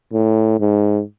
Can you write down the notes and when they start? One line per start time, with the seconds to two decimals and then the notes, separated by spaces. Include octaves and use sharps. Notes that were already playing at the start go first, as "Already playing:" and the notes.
0.13 A2
0.60 G#2